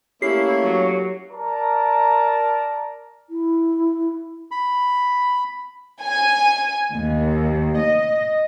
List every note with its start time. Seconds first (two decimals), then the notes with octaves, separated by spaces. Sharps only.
0.22 A3 A#3 C#4 E4 G4 C7
0.63 F#3
1.30 A#4 D5 A5 A#5
3.30 E4
4.51 B5
6.01 G#5
6.93 D#2
7.80 D#5